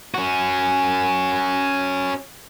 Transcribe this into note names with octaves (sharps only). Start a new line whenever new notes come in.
C#4 F#4